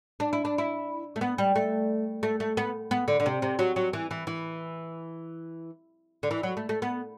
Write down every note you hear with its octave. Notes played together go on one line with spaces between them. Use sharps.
D4
E4
D4
E4
A3
B3
G3
A3
A3
A3
B3
B3
D3
D3
C3
C3
F#3
F#3
E3
E3
E3
D3
E3
F#3
A3
A3
B3